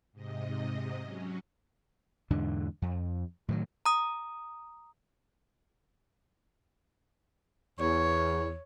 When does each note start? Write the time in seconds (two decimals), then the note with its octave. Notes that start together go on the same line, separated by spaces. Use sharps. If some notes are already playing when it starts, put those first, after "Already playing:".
0.12 G#2 C3 D#5
1.01 F#3 C#4
2.30 E2 G#2 D3 D4
2.82 F2
3.48 A2 D#3 E3 F#3
3.86 A#5 D#6
7.79 E2 C#5